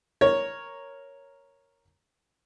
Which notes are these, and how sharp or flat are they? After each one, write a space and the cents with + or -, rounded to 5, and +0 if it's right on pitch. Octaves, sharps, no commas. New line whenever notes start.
A#4 +0 C#5 +0